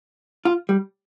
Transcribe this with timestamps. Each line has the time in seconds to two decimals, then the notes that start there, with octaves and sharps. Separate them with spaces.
0.45 F4
0.69 G3